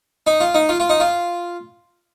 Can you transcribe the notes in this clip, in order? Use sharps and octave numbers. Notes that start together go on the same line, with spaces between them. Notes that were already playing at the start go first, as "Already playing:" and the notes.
D#4
F4
D#4
F4
F4
D#4
F4